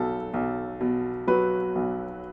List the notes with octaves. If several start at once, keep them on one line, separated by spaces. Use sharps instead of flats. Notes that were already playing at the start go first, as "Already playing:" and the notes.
Already playing: B1 F#3 A4
B1
B2
F#3 B4
B1